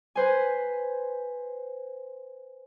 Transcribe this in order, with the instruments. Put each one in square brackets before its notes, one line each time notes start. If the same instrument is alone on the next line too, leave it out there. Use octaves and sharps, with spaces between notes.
[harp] B4 C5 G#5